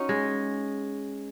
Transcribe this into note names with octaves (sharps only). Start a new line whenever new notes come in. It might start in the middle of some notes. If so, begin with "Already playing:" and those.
Already playing: C#4 D#4 F#4
G#3